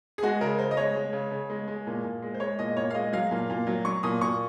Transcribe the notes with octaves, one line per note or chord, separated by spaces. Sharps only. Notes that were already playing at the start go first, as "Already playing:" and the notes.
G#4
G#3 F#4
C#3 A#4
C#3 C5
D#5
G#3 C#5
G#3
C#3
C#3
G#3
G#3
A#2
A#2
G#3
C5
G#3 C#5
A#2 D#5
A#2 C#5
F5
G#3 D#5
F#3 F5
A#2
A#2
F#3
F#3 C#6
A#2 D#6
A#2 C#6